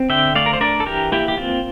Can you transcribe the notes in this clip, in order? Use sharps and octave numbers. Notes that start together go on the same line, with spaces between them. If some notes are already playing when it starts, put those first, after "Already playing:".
Already playing: C4
D3 E5 G5
A3 D5 F5
A#4
C5
D4 A#4 D5
A4
E3 G4 A#4
A#3 E4 G4
G4
C4 F4